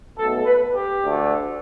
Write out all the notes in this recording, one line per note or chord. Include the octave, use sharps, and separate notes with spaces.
B1 B2 A3 A4
B4
G4
D2 D3 A3